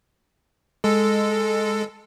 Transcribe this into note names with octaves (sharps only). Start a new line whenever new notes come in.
G#3 A4